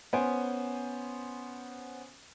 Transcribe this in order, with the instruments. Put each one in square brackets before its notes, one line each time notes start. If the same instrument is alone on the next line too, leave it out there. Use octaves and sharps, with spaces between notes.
[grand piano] B3 C#4 C5 G#5 D7